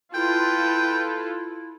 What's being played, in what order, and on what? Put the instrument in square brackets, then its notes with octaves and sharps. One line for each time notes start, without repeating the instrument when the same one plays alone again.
[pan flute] E4 [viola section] F4 A4 B4 [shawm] G5